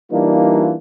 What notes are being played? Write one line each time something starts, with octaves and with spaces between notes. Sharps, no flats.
E3 G3 A#3 D4 D#4 F4